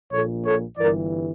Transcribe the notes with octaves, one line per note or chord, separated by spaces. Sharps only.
A#1 A#2 A4 C#5
A4 C#5
G1 G2 E3 A#4 D5